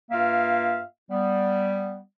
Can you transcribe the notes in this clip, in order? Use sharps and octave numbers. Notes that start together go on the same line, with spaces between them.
G2 A#3 F4 E5 F5
G3 B3